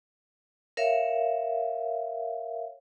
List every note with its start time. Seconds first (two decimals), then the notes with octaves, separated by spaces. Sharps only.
0.77 A#4 C#5 E5 F5